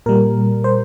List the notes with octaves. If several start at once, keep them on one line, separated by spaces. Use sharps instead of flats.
A#2 G3 A#4
C5